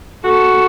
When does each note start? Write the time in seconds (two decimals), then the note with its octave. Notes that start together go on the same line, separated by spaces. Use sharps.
0.24 F#4 A4